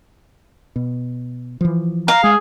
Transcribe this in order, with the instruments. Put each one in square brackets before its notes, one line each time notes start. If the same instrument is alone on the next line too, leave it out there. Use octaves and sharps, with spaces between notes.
[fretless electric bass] B2
E3 F3
[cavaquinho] F5 [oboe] A#5
[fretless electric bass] G#3 [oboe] G#4